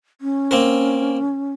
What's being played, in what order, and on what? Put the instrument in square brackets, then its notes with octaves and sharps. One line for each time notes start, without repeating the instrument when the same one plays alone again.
[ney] C#4
[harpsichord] A#3 C4 A#4